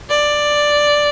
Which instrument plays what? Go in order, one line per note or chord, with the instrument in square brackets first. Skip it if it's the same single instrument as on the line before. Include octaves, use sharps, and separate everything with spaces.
[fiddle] D5